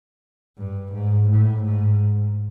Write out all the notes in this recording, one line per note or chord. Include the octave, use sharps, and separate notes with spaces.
G2
G#2
A2
G#2